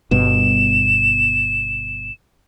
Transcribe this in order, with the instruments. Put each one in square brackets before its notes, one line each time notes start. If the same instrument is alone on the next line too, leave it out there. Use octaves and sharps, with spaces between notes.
[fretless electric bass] G1 G2 B2 [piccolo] E7